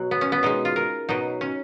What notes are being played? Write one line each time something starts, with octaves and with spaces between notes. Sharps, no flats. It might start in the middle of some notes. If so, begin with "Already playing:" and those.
Already playing: B2 F#3
B3
C#4
B3
B2 G#3 D#4
F4
A#4
B2 F#3 D#4
C#4